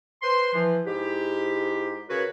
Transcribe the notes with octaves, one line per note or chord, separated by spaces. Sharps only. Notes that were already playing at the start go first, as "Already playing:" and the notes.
B4 C5 C6
E3 F3
G#2 E4 G4
C#3 F#4 A#4 B4 C#5